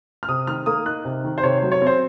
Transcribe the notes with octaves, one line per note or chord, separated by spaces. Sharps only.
F6
C3 D#6
D#3 F6
A#3 D#6
D#4 F#6
C3
D#3
C5
C3 C#5
F#3 C5
C#5
C4 C5